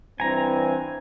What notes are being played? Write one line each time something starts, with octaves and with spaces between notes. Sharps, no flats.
G2 E3 C4 G#5 A#5